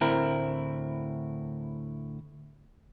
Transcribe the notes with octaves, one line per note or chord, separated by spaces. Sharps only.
D2 A2 C4 E4 A#4